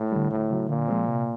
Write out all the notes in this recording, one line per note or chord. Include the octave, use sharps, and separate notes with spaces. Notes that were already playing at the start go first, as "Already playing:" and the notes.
Already playing: A2
D3 G3
D2 A2
C#3 F#3
A#2 D3
F3 G#3 C4
C3